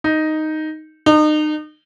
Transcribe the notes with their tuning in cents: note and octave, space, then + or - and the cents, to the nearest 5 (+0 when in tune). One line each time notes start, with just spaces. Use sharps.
D#4 +0
D#4 -35